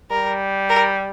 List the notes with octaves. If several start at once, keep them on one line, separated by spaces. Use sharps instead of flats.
G3 A#4
A#4